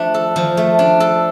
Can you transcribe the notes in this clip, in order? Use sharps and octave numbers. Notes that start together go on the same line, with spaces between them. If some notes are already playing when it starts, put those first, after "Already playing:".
Already playing: F3 A3 D4
A4
F3
A3
D4
A4